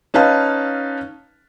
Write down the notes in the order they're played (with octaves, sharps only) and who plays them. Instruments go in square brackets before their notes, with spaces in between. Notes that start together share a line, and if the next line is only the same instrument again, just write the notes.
[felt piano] C#4 D#4 B4 F5 A5